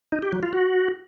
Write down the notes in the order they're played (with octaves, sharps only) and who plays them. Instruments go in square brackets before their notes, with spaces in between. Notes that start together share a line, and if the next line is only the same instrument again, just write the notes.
[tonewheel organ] D#4
G4
F#3
F4
F#4